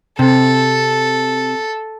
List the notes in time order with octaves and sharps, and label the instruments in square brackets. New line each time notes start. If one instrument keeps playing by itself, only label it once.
[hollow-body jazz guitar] C3 [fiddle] A4